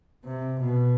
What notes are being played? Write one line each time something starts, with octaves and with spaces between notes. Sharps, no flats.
C3
B2